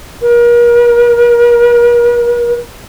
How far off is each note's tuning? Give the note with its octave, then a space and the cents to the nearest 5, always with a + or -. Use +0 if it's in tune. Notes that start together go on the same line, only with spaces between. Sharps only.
A#4 +40